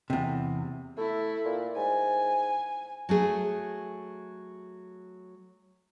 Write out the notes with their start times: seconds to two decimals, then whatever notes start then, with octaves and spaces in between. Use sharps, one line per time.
0.10 E2 C3
0.98 A3 E4
1.45 A#2
1.76 G#2 G#5
3.09 F#3 A3 G#4